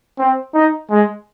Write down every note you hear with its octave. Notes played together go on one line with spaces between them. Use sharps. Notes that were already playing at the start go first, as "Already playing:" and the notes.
C4
D#4
G#3